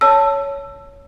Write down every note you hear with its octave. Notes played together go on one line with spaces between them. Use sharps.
C#5 A5 E6